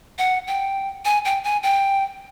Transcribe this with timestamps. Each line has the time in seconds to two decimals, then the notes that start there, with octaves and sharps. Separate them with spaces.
0.19 F#5
0.47 G5
1.05 G#5
1.25 G5
1.44 G#5
1.63 G5